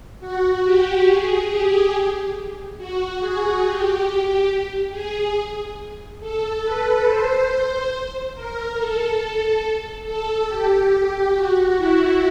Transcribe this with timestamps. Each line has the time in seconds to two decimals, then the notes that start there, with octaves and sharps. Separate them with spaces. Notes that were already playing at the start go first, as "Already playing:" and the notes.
0.20 F#4
0.64 G4
1.06 G#4
1.49 G4
2.77 F#4
3.20 G#4
3.63 G4
4.06 G4
4.91 G#4
6.20 A4
6.63 B4
7.05 C5
8.35 A#4
8.77 A4
10.05 A4
10.48 G4
11.34 F#4
11.76 E4